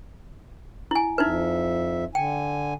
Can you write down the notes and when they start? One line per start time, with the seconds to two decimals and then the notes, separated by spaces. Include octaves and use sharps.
0.91 E4 G#5
1.18 F2 D#4 E4 B4 E5
2.15 D3 G5 G#5